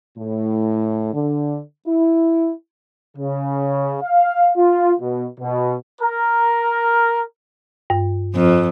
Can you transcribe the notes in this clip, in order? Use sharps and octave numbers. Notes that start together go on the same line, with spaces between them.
A2
D3
E4
C#3
F5
F4
B2
B2
A#4
G2
F2